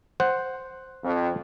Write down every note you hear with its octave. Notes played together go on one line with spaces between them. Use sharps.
C5 F#5
F2